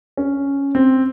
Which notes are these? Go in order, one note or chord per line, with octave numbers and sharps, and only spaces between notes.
C#4
C4